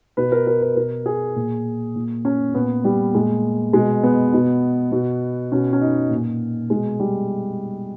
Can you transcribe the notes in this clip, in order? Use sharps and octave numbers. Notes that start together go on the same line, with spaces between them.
B2 B4
A#4
A#4
B4
B2 A#4
G#4
A#2
A#2
C#4
A#2 B3
G3
A#2 G#3
B2 G#3
B3
B2
B2
B2 C#4
C#4
D#4
A#2
B2 G#3
G3